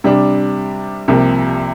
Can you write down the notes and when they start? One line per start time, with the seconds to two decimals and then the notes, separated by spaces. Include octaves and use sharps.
0.04 C3 G3 D4
1.08 C2 C3 F3 A#3